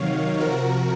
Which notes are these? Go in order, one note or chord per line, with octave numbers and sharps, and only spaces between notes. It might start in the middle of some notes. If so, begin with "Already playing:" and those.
Already playing: C3 D#3 F#3 C#5 F5
C3 F3 F#4 A#4